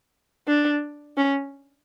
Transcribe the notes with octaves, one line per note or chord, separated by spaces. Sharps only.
D4
C#4